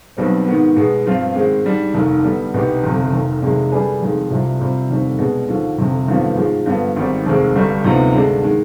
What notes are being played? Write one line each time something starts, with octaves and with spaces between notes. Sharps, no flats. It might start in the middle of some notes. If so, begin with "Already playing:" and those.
B1 B2 G3 C4
G#2 D#3 B3
B2 G#3 B3
G2 F3 C4 F4
G#2 D#3 G#3 C4
G#2 G3 D4
F1 D#2 D#3
D3 G3 B3
C2 B2 B3 D#4 G4
G1 F2 C3
F1 F2 D#3
F2 C3 D#3 G#3 D4
D3 G3 D4 G#4 B4
F1 F2 D#3 G#3
C2 C3 G3 C4 F4
C3 G3 C4 F4
F1 D#2 D3 G3 C4
B2 G#3 D4
D#2 D3 F3
G1 F2 C3
G#1 G2 D3 F3 B3
G#2 F3 G#3
G2 D3 F3 B3
G#1 G#2 D#3 G3 C4
F1 D#2 D#3 G#3 C4
G1 G2 D3 G3
D2 C3 F3 B3 D#4
G2 D3 G#3 D4
D#3 G#3